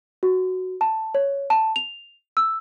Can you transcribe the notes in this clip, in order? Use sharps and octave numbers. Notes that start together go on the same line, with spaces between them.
F#4
A5
C#5
A5
F7
E6